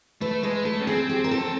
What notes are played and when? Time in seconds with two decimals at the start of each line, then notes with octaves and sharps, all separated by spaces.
0.21 A3 B4
0.43 G#3 B4
0.65 A3 A4
0.80 C#4
0.87 C4 G#4
1.09 G4
1.24 A#4
1.31 A4